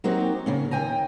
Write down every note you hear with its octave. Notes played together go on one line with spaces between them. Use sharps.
F#3 A#3 C4 D#4 F#4 G4
C#3 A#3 C#4
D#2 G5 G#5 A#5